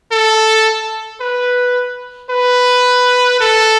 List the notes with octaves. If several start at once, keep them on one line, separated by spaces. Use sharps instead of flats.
A4
B4
B4
A4